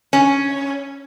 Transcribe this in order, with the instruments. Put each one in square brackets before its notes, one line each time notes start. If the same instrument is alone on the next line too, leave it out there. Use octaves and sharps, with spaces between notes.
[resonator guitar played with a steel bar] C#4